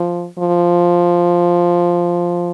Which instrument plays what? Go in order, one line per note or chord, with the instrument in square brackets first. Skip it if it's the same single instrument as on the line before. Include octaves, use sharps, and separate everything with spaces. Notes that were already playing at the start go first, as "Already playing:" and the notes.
Already playing: [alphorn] F3
F3